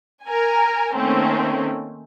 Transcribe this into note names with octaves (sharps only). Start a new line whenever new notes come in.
A#4 G#5
D#3 A3 A#3 C4 C#4